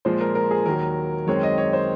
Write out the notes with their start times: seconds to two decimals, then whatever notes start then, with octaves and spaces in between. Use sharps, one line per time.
0.05 A#2 F3 G#3 C5
0.21 A#4
0.35 A#4
0.51 G#4
0.66 D#2 D#3 F#3 A#4
1.27 F#2 D#3 G#3 C4 C#5
1.43 D#5
1.58 C#5
1.73 C5